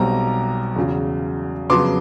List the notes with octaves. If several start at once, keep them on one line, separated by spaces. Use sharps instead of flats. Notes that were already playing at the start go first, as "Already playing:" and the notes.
Already playing: B1 B2 G3 C4 A#5
E2 C#3 F#3
F2 C#3 F#3 B3 C6 D6